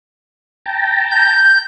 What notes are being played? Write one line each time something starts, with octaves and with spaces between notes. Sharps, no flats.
G5 A5 A#5
G6